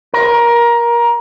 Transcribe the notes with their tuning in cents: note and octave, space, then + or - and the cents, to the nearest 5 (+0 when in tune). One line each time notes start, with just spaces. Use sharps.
A#4 +20